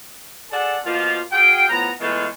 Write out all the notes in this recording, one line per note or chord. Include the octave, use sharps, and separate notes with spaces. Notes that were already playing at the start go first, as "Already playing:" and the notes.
G#4 A4 D5 F#5 A5
B2 F3 A#3 F4
F#4 G#4 F5 G5
A2 F3 B3 A#5
E3 G#3 A3 B3 F4 C#5